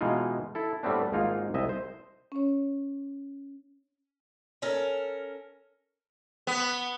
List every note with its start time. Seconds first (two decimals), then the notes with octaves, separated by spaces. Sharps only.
0.01 B2 E3 G#3 D#4 F4
0.55 E4 A4
0.83 A2 G3 A3 B3 C4 D4
1.12 G#1 G#2 A#3 D#4 F4
1.54 C2 D#5 E5
1.69 C5
2.32 C#4 C#5
4.62 C#4 A4 A#4
6.47 B3